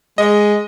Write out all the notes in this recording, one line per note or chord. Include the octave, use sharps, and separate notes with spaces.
G#3 D#5